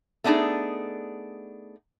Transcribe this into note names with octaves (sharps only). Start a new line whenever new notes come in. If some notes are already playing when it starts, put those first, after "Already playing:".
A3 B3 D4 D#4 G#4